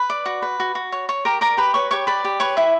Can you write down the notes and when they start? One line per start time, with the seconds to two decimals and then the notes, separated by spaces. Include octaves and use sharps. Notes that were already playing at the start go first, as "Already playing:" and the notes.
Already playing: B4 B5
0.10 D5
0.26 F#4
0.42 B4
0.60 F#4
0.75 F#4
0.92 C#5
1.09 C#5
1.25 G4 A#4 A#5
1.41 A#4 D5 A#5
1.57 G4 B4 B5
1.74 B4 C#5 C#6
1.91 G4 C#5 C#6
2.07 B4 D5 B5
2.24 G4
2.40 B4 C#5 C#6
2.57 E4 E5